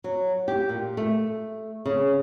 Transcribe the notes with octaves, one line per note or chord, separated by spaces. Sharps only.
F#3
G4
A#2
A3
C#3